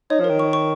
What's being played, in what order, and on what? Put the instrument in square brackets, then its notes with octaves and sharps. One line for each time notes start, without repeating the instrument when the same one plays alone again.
[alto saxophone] D#4 [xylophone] C#5
[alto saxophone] F3
[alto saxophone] D#3 [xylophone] A#4
[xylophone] C#6
C#6